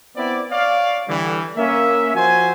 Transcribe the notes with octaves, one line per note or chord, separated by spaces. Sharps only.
B3 C4 E4 D5
C#5 D5 F5
D3 E3 G3
A#3 C#4 E5
F3 F#4 C5 G#5